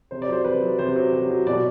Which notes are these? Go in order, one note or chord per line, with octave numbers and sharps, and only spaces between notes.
C3 C5
D5
F#3 C5
C3 B4
F#3
C3 C5
F#3
C3
F#3
B2 D5